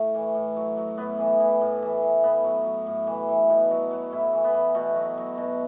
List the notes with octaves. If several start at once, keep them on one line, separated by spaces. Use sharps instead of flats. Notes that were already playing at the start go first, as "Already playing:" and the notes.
Already playing: A2 A3
E3
A2
F#3
F#3
A2 B3
E3
E3
A2
E3
E3
A2 B3
F#3
F#3
A2
E3
E3
B2 B3
F#3
F#3
A2 E4
E3
B3
E3
B2 A3
F#3
F#3
B2